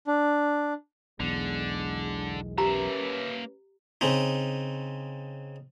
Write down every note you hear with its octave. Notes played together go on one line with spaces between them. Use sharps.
D4
B1 E2 D3 G#3
A#3 C#4 G4 B4 E5 A#5
C#3 C4 D#4